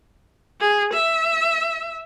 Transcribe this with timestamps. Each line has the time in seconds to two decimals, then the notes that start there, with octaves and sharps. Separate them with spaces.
0.61 G#4
0.94 E5